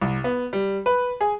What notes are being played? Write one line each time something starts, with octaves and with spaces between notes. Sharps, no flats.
C2
B3
G3
B4
G#4